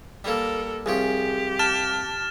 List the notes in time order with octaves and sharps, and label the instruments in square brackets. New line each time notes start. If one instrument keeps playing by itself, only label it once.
[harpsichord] G3 A#3 [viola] A4 A#4
[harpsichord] C2 F3 C#4 [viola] G4 [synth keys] G#4
[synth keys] A5 [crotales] F6 A6 E7